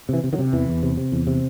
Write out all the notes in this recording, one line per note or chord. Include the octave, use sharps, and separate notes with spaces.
C3 E3
C3
D#3 F#3
C3
E2 E3
E2
C3
C3
E2
C3